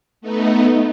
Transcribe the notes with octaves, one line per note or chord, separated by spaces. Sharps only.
A3 B3 D#4